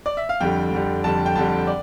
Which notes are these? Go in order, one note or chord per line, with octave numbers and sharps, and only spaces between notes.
D5
E5
F5
F2 D3 G3 G5
F2 D3 G3
F2 D3 G3 A5
G5
F2 D3 G3 A5
D5